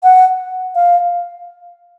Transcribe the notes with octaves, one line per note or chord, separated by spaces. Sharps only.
F#5
F5